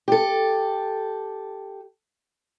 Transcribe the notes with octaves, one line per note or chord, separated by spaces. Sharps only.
G4 A4